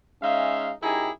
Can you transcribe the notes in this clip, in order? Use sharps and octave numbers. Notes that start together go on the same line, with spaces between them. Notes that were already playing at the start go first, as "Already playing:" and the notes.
G#3 C#4 D#4 E5 F5
F#2 D#4 E4 G4 G#4 A#5